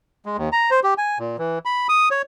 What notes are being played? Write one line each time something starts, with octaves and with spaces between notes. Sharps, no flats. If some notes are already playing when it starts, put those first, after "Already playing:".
G#3
D#2
A#5
C5
G4
G#5
A#2
E3
B5
D#6
C#5